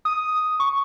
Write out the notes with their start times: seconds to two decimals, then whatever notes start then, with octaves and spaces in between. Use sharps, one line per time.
0.05 D#6
0.60 C#6